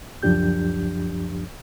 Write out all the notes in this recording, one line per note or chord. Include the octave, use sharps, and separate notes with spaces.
C#2 F#2 F3 D4 G4 G6